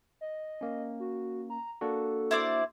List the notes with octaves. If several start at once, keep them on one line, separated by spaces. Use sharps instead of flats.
D#5
A#3 C#4
F#4
A#5
A#3 D4 F#4 A4
E4 C5 D5